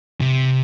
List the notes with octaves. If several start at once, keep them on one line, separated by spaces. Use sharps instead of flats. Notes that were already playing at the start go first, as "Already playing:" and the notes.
C3